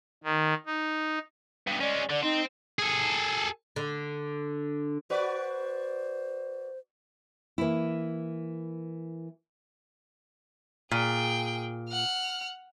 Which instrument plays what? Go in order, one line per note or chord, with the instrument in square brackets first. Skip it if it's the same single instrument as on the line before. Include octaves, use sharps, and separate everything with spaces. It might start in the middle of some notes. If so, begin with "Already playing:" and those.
[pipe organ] D#3
D#4
[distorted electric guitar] G2 B2
[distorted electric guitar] G#3 C#4 [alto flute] D5
[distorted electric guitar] D3 [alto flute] D5
[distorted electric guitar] C4 [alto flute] D#4
[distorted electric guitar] G#4 A4
[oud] D3
[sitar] F#4 B4 D5 [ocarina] C5
[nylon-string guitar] E3 A#3 E4
[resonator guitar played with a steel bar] A#2 [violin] G#4 G5
[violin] F#5 F6